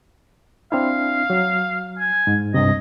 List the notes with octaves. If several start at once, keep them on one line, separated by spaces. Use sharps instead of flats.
C4 D4 E4 F5
F#3
G#5
G#2
C2 G2 C3 D#5